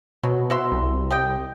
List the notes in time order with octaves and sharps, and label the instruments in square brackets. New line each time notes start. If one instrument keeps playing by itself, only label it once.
[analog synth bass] B2 [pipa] F#3
[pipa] F#4 E5 C6
[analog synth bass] C2
[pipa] G4 D#5 G5